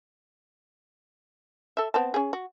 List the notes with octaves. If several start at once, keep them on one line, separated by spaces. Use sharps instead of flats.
A4 E5
B3 C4 A5
C#4 G#4
F#4